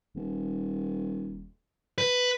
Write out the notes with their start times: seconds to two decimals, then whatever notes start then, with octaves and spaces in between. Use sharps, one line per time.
0.15 D#1
1.98 B4